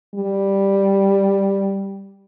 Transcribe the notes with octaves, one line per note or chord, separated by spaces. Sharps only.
G3